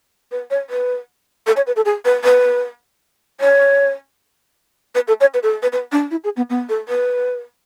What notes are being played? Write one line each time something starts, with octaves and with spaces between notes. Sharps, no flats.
B4
C#5
B4
A4
C#5
B4
A4
G#4
B4
B4
C#5
B4
A4
C#5
B4
A4
B4
B4
D4
E4
G#4
B3
B3
A4
B4